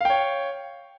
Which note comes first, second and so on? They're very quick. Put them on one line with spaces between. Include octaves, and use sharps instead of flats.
F5 G5 C#5